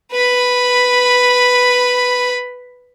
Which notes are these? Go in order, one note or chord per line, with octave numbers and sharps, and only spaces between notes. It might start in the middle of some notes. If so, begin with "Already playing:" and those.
B4 B5